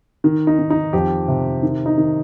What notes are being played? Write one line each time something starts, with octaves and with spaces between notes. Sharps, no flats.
D#3
D#4
D#3
D#4
F2 G4
C3
D#3
D#4
D#3